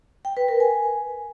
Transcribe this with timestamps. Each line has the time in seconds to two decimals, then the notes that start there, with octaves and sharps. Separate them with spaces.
0.25 G5
0.37 B4
0.48 A#4
0.60 G#5